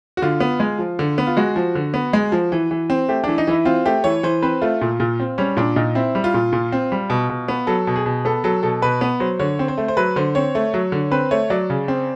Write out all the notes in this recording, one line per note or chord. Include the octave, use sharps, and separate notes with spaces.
F#4
D3 F4
B3
G#3
F3
D3
B3
F4
G#3 F#4
F3
D3
B3
G#3
F3
E3
E3
C4
A3 G4
E3 D4
D#4
E3 E4
C4 F4
A3 G4
E3 C#5
E3 C5
C4 B4
A3 F4
A#2
A#2
C4
G3 C#4
A#2 D4
A#2 D#4
C4 E4
G3
F4
A#2
A#2
C4
G3
B2
B2
B3
F#3 A4
B2
G#4
B2
B3 A4
F#3 A4
B2 A4
B2 B4
B3
F#3 C5
D3 C#5
C4
C5
A3
C5
F#3 B4
D3 C5
C4 C#5
A3
F#3
D3
C4 B4
A3 C#5
F#3 D5
C#3
C4